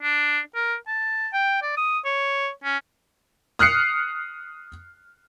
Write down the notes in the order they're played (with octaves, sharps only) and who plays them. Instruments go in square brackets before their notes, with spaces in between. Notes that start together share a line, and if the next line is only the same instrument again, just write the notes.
[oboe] D4
A#4
A5
G5
D5
D#6
C#5
C#4
[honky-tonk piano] D#6 F6 F#6 C7 C#7